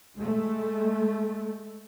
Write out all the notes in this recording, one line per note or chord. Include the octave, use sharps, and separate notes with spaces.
G#3 A3